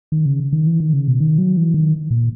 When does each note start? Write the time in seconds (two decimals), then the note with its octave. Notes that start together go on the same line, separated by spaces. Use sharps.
0.12 D#3
0.26 C#3
0.53 D#3
0.67 E3
0.80 D#3
0.93 C#3
1.08 B2
1.20 D#3
1.38 F#3
1.57 E3
1.74 D#3
2.11 A#2